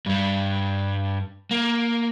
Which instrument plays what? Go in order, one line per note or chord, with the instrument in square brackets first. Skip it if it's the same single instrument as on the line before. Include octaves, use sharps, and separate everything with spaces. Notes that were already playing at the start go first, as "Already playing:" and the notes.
[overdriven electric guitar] G2 G3
A#3